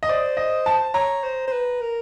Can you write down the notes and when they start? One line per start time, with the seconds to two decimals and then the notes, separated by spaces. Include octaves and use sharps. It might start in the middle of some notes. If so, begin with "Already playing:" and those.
0.03 D#5
0.09 C5 D5
0.37 D#5
0.66 A5
0.94 C#5 A#5
1.23 C5
1.47 C5
1.52 B4
1.81 A#4